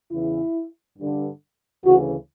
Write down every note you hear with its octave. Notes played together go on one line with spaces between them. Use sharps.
E2 C#3 E3 E4
G2 D3
D2 C#3 E3 F#4